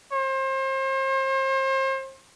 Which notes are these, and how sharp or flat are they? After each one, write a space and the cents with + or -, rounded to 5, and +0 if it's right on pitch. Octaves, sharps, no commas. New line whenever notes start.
C5 +35